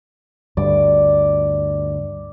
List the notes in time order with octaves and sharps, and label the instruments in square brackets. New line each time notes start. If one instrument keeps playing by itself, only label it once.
[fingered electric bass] D2 G2 [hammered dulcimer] D5